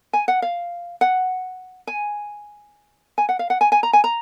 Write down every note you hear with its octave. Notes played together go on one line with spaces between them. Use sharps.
G#5
F#5
F5
F#5
G#5
G#5
F#5
F5
F#5
G#5
G#5
A#5
G#5
A#5